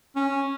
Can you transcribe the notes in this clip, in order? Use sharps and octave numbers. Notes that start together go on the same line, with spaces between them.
C#4